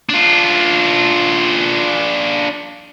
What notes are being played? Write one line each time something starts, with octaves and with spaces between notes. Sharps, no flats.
D4 F4